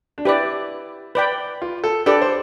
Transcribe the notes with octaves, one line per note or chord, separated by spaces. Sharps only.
D4
E4 G4 B4 D5
B4 D5 G5 B5
F4
A4
D4 G4 A4 B4 D5
C5